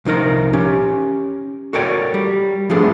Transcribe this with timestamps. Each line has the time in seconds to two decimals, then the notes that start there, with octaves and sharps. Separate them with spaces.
0.05 C2 F3 D#4 A#4 A#5
0.53 C#4 G4
1.73 F#4 A4 A#4 C#5 D5 G5
2.14 G3
2.70 F3 A3 B3 D4 G#4 A4